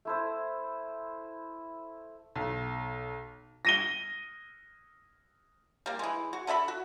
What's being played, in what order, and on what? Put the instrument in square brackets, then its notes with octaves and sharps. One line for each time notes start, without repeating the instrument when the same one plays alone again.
[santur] A3 E4 C5
[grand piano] B1
[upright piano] A#6 D#7 G7
[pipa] G3 A#3
E3 G#3
F#4
D3 A4 E5 B5
F#4